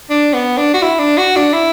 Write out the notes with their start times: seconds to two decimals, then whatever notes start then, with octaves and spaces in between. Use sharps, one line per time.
0.10 D4
0.33 B3
0.57 D4
0.74 F#4
0.82 E4
0.99 D4
1.18 F#4
1.36 D4
1.53 E4